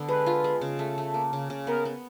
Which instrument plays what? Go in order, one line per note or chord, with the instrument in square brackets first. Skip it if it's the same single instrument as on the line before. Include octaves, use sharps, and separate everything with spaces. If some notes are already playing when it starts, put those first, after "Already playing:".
Already playing: [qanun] D3 B3
[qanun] G#3 [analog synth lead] B4
[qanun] F4
G#3
C#3
A3
A3
A#3
C#3
C#3
[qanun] B3 [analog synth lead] A#4
[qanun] B3